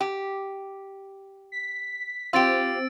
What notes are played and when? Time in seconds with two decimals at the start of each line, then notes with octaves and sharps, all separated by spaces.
0.01 G4
1.52 B6
2.33 C4 F4 G4 E6 A6 D7